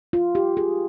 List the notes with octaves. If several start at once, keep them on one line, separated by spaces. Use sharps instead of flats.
F4
G4
G#4